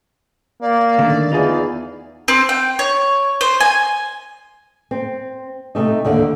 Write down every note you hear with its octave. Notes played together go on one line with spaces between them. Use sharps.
A#3 D5
D3 D#3 A3
E2 D#4 F4 G#4
C4
G5
C#5
C5
G#5
C4
C3 A3 D#4
D#2 D3 F#5